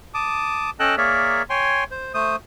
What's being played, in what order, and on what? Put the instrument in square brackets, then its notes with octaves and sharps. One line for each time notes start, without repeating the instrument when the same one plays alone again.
[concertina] A5 D6 D#6
C#4 A4 D#5 G5 A5 F#6
A#3 G#4 A#4 C#5 D5 E5
C#5 G5 G#5 C6
C5
A3 C5 D#6